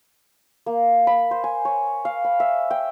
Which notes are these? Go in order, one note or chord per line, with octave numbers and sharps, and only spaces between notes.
A#3
B5
C5
G#5
C#5
F5
B5
E5
G5